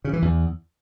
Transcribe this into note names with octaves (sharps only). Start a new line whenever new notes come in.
C#3
E3
E2